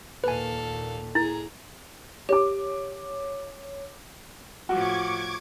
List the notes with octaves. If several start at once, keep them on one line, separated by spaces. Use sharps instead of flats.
D#2 A#2 A4 B4 F5 G#5
E4 G#4 A#5
G4 C#5 D6
A2 F3 F#4 C#6 D6 G#6